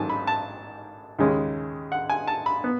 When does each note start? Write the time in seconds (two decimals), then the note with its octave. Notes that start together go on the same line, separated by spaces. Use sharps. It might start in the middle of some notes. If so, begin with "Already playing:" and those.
Already playing: A1 G#2 D#3 F#3 G#5 A5
0.10 B5
0.27 A5
1.19 D#2 C#3 G#3 C#4
1.92 F#5
2.10 G#5
2.28 A5
2.46 B5
2.64 B3